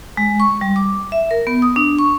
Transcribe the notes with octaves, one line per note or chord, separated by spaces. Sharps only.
G#3
C#6
G3
D6
E5
A#4
B3
D#6
D4
C#6